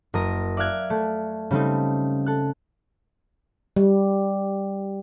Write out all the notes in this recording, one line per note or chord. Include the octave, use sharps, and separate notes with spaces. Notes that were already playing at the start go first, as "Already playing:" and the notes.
F#1 A#4 D#6 A#6
D5 E5 F5 F6 F#6 G#6
A3
C#3 G3 A3 C4 D#4
A4 F#6
G3